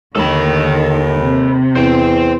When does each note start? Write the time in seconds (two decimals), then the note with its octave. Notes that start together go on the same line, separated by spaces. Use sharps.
0.15 D#2 D3 D#3 A4 B5
1.20 C3
1.76 E2 C5 G5